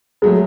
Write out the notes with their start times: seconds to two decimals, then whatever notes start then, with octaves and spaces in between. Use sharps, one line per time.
0.22 A2 F#3 G#3 A3